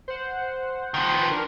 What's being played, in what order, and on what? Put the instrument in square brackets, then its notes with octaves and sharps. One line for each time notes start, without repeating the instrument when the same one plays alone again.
[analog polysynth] C5 F#5
[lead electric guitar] D#3 F3
[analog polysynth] B4
D4 A#4